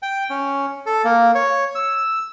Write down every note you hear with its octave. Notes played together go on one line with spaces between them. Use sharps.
G5
C#4
A4
A#3
C#5
E6